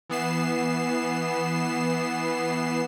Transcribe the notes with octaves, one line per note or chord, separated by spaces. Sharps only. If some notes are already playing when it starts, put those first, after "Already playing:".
E3 B3 C7 E7